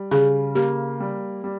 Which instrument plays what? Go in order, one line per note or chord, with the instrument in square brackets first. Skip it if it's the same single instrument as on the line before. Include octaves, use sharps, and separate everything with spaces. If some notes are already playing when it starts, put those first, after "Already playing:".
Already playing: [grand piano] G3
[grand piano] C#3 [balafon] G#4
[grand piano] A#3 [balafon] G4
[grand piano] G3
G3